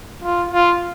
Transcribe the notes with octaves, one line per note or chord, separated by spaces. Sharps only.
F4
F4